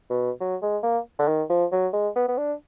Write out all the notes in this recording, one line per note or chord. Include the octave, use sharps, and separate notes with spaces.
B2
F#3
G#3
A#3
D3
D#3
F3
F#3
G#3
B3
B3
D4